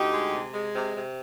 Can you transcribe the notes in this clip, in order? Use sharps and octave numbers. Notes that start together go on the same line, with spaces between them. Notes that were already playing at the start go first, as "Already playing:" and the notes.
Already playing: D2 D#4 G4
G#3
C3
G#3
C3
C3